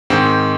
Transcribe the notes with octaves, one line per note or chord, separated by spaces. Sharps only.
G#2 D#3 C4